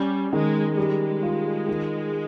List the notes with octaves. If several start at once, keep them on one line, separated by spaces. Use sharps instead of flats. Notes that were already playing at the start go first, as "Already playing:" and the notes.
Already playing: G3 C#4
D#3 G#3
G3 G#3
F4
D#3